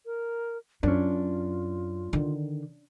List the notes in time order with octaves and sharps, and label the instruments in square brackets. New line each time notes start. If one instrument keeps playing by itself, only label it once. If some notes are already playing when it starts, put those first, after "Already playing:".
[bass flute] A#4
[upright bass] F#2 [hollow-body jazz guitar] C#4 D4 [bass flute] F4
[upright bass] D3 D#3